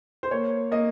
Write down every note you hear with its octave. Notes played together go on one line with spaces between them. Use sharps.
C5
A#3 C#5
A#3 D#5